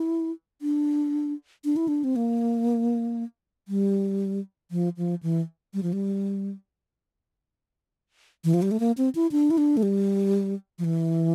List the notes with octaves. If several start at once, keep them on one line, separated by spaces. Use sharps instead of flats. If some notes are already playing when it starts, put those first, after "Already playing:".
Already playing: E4
D4
D4
E4
D4
C4
A#3
G3
F3
F3
E3
G3
F3
G3
E3
F3
G3
A3
A#3
C4
E4
D4
E4
D4
A3
G3
F3
E3